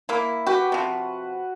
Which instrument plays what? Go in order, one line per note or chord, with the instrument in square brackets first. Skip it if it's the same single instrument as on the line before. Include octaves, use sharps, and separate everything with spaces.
[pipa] A#3 E4
[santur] F#4 B4 [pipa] G4
[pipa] C3 F3